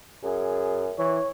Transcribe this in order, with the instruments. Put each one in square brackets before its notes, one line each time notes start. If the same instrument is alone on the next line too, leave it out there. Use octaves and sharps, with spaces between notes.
[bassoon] F#2 [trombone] G#4
[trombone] E3 [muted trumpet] C#5